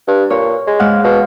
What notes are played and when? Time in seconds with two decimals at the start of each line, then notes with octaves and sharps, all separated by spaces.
0.08 G2
0.30 A#2 C#5
0.67 G#3
0.79 G#2 F5 F#5
1.04 B2 F5